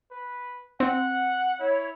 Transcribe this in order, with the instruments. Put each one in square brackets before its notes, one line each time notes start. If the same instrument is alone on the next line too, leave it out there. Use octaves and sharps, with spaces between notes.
[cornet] B4
[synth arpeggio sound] C4 [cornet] F#5
[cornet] E4 [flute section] C#5